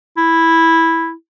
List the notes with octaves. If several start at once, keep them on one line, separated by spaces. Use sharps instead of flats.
E4